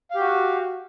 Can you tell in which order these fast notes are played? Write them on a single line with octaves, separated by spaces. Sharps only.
F5 G4 F#4